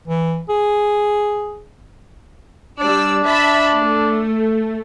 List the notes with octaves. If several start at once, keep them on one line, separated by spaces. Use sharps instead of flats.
E3
G#4
G3 D4 D5 E6
E5 A5 B5
A3